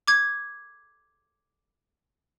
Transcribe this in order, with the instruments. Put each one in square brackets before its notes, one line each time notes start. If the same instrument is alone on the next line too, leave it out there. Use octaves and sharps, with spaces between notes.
[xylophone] D6 G#6